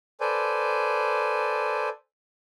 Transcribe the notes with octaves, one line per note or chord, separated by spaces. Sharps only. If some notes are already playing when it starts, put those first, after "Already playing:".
A4 B4 C5 D5 G#5